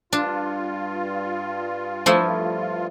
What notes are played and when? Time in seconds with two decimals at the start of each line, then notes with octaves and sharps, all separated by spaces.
0.13 G2 D4 F4
2.06 F3 A3 E4